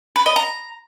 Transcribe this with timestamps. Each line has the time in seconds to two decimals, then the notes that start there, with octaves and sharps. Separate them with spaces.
0.16 B4
0.26 D#5
0.36 A#5